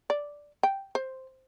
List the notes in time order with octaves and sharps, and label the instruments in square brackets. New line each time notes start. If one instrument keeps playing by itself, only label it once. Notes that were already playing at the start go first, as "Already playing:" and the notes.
[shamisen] D5
G5
C5